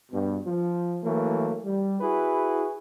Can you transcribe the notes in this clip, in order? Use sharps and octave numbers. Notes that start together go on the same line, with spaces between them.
G2 B2
F3
E3 F#3 A3 A#3
G3
E4 F#4 G#4 B4